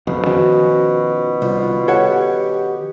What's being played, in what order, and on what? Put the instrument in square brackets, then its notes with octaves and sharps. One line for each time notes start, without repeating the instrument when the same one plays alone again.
[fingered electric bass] F#1 F2 [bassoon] B2
[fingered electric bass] D#3 F3 C#4 [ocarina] F#4
[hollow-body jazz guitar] C2 [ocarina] F4
[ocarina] G4 [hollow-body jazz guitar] A4 C#5 F#5